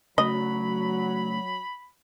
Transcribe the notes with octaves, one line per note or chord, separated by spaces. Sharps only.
C#3 F#3 A3 D#5 B5